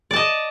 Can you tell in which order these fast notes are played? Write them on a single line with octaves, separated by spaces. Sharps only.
D5 A5 D#5